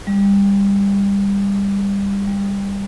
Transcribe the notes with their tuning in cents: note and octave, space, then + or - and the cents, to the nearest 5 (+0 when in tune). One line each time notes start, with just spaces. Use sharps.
G3 +25
G3 +20